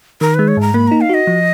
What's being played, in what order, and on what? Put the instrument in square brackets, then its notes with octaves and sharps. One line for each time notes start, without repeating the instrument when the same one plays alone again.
[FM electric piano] D#3 [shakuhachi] A#4
[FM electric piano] G#3 [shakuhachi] B4
[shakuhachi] C#5
[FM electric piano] G#2 [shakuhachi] A#5
[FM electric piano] A#3 [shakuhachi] B5
[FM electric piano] D#4 [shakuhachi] A#5
[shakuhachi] F5
[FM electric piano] F#4 [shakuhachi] D#5
[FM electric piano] F3